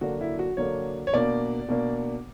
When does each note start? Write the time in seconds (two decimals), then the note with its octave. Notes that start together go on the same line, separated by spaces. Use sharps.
0.01 D3 F#3 A#3 D4 F#4
0.21 E4
0.39 F#4
0.57 D3 F#3 A#3 D4 C#5
1.07 C#5
1.13 B2 A#3 D4 D5
1.68 B2 A#3 D4